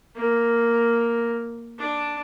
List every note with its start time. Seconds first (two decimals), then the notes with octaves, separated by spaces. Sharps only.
0.16 A#3
1.78 D4